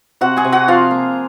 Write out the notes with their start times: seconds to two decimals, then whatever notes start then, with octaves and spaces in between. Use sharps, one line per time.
0.21 C3 F#4 F#5
0.37 G#4 G#5
0.45 C3
0.52 F#4 F#5
0.68 F3 F4 F5
0.91 A#3